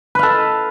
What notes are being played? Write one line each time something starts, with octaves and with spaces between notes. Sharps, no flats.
A4 B4 F5